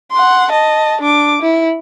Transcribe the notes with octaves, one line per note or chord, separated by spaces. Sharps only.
F#5 C6
D#5 A5
D4 D6
E4